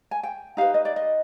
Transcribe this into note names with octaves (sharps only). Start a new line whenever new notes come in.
G#5
G5
D#4 G4 B4 F5
D#5
D5
D#5